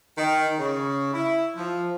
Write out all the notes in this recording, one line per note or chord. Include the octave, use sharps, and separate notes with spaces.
D#3
C#3
E4
F3